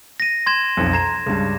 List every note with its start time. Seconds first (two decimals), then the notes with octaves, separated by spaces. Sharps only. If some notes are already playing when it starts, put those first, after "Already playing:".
0.20 A#6 D#7
0.46 C6 G#6 E7
0.77 B1 F2
0.93 A#5 C6 G#6 E7
1.26 C#2 G2